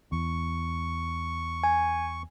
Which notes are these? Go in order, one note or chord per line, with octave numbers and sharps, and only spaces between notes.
E2 C#6
G#5